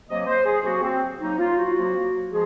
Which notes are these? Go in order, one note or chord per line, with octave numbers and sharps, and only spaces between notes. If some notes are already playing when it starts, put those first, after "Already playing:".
C3 F#3 A#3 D#5
C5
G#4
C3 F#3 A#3 F#4
C4
C3 F#3 A#3 D#4
F4
F#4
C3 F#3 A#3
F3 G#3 G#4